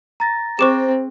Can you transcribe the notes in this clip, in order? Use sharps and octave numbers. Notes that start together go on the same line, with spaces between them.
A#5 A6 A#6
C4 G#4 C5 C#6 D6 E7